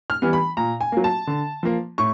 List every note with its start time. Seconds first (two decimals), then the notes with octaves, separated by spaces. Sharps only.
0.10 F6
0.22 E3 G3 B3
0.33 B5
0.57 A#2 A#5
0.81 G#5
0.92 F#3 A#3
1.04 A5
1.27 D3
1.63 F3 A#3
1.98 A2 C#6